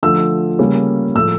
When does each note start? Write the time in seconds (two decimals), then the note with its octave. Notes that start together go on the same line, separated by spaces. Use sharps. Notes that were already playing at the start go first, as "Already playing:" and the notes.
0.03 D3 F3 A3 E6
0.59 C#3 G3 A#3 C#4
1.15 A2 F3 A3 E6